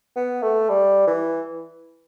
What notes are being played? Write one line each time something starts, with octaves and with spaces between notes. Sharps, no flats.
B3
A3
G3
E3